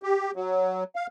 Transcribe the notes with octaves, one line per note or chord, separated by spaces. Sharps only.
G4
F#3
F5